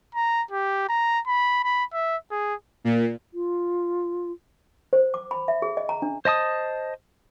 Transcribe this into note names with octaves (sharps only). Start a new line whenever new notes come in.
A#5
G4
A#5
B5
B5
E5
G#4
A#2
F4
C5
D6
B5
E5
G#4
D#5
A#5
D4
C5 D#5 A5 D#6